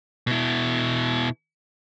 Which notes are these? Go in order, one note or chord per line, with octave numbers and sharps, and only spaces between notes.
B2 E4